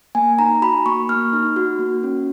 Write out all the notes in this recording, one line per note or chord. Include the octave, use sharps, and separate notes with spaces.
A#3 G#5
D#4 A#5
F#4 B5
A#3 C#6
A#3 F6
D#4
F#4
A#3
C#4